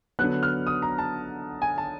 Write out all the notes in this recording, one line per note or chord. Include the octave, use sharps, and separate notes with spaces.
D3 F#3 B3 F#6
F6
D#6
A#5
A5
G#5
A5